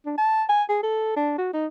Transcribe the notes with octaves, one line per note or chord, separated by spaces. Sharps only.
D4
A5
G#5
G#4
A4
D4
F#4
D#4